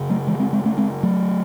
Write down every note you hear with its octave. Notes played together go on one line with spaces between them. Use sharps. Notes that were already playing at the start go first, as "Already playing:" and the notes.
Already playing: F#1 C#3
F#3 A3
E3 G#3
G#3 C4
G#3 C4
A3 C#4
G#3 C4
F#3 A3